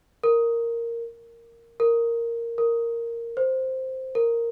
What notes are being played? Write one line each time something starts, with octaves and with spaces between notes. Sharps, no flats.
A#4
A#4
A#4
C5
A#4